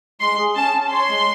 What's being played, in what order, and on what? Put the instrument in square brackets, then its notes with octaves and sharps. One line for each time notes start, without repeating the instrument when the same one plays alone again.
[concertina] G#3 [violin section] C6
[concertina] G#4
[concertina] C#4 [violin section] A5
[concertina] C#4
[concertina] C#5 [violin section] C6
[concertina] G#3